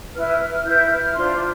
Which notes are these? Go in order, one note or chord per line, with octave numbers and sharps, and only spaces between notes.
E4 B4 F6
F6
F6
E4 B4 G6
F6
D4 F4 C5 C6